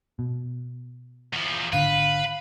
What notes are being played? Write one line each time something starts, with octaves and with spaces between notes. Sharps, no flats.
B2
E2 F3
G#1 D3 B4 F5